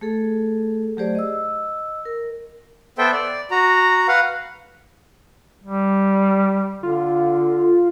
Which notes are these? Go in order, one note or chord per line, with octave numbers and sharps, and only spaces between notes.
A3 G#4 A4
F#3 A3 G4 G#4 C5 D5
D#5 E6
A#4
B3 A4 C5 E5 G5
D5
F#4 A#5
B4 F5 F#5
G3
D3 F4